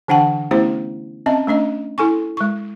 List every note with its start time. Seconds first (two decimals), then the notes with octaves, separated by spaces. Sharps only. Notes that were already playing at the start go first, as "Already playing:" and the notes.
0.08 D3 E3 D4 F#5 G5 A5
0.51 A3 B3 C#4 E4 G4 C5
1.26 C4 C#4 D#5 E5 A5
1.47 A3 C#4 D4 D#5
1.98 E4 A4 G#5 C#6
2.37 G#3 C#6